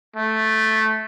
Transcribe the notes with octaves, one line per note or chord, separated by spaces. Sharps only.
A3